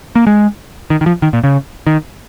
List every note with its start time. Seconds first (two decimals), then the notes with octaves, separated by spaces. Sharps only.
0.15 A#3
0.27 G#3
0.90 D#3
1.01 D#3
1.06 F3
1.22 D#3
1.33 A#2
1.44 C#3
1.87 D#3